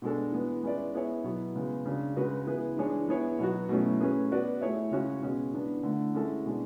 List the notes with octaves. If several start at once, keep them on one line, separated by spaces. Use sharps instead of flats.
B2 G#3 D4 A4
E3 G#3 B3
G#3 C#4 E4 B4 D5
B3 E4 G#4 C#5 E5
B2 F#3 B3 E4
C#3 G#3 B3
C#3 G#3 D4 F#4
C#3 G#3 C#4 F#4 B4
E3 B3 E4 G#4 B4
E3 G#3 D4 G#4 C#5
E3 B3 E4 G#4 C#5
B2 F#3 B3 F#4
B2 F#3 A3 C#4 E4
A3 C#4 G#4 B4
B3 F#4 B4 D5
A3 E4 G#4 C#5 E5
C#3 G#3 C#4 F#4 C#5
B2 G#3 C#4 G#4
E3 B3 D4
D3 A3 E4
G#3 C#4 E4 A4
B2 G#3 D4